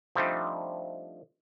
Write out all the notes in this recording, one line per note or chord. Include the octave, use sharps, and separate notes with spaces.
F3 G3 A3 C4 D4 D#4